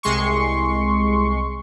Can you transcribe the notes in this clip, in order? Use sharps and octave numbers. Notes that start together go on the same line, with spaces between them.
C2 G#3 C6 C#6